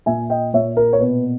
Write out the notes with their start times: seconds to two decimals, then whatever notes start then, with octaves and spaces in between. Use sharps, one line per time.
0.06 A#2 E5 G#5
0.30 D#5 G5
0.54 A#2 C#5 E5
0.77 A#4
0.93 C#5
1.00 B2 B4